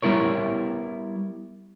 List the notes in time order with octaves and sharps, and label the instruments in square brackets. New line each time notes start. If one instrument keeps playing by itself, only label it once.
[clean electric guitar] G3 B3 E4 A#4 C#5